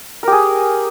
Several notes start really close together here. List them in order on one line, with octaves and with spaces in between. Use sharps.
A#4 G4 G#4